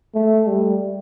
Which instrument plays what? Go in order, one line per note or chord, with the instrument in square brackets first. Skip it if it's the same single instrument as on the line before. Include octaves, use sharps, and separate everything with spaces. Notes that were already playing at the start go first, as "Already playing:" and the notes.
[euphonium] A3
G3